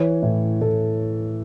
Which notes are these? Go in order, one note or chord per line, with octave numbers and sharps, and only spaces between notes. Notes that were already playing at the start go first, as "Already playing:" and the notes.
Already playing: E3 C#5
A2
A2 A4